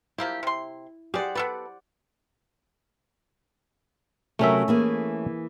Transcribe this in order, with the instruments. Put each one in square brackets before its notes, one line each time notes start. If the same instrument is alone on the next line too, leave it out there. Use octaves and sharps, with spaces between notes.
[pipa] F3 A#3 G4 [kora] E4
[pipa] C3 C6
[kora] G4 C5 F#5 [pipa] G#4 D5
[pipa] B3 A4 B4 [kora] D5 F#5
[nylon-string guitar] C3 F#3 A#4 [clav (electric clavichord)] A3 C#4 E5
[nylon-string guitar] E3 A#3 G#4